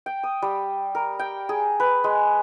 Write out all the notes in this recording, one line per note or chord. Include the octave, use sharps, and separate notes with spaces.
G5
D#6
G3
A#4
G5
G#4
B4
G#3